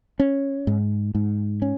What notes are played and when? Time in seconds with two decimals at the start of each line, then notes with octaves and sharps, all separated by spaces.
0.20 C#4
0.67 G#2
1.15 G#2
1.62 C#4